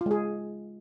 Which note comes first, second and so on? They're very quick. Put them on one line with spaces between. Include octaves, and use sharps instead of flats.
F4 G#3 G#4